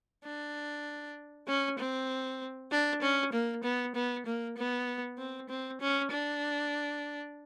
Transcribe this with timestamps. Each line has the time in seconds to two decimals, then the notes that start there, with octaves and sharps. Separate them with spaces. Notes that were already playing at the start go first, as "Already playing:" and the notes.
0.24 D4
1.47 C#4
1.78 C4
2.72 D4
3.02 C#4
3.32 A#3
3.63 B3
3.95 B3
4.26 A#3
4.57 B3
5.18 C4
5.49 C4
5.80 C#4
6.11 D4